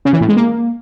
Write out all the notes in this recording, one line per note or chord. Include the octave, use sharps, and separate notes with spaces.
C#3
E3
A2
G#3
A#3